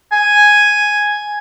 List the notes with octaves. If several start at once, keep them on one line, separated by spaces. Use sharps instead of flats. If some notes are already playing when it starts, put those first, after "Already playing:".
G#5